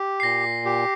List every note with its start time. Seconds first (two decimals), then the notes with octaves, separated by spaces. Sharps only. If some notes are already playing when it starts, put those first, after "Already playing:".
Already playing: G4
0.20 C7
0.23 A#2 A#6
0.65 G4